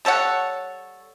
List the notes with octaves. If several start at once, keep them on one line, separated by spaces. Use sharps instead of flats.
G3 A4 C#5 F#5